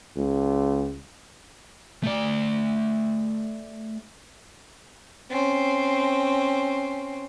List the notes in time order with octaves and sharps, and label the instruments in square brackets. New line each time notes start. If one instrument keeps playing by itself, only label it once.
[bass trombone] C#2
[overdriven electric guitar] A3 D5
[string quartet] C4 C#4